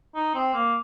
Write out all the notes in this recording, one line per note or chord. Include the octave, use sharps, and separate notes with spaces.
D#4
C4
A#3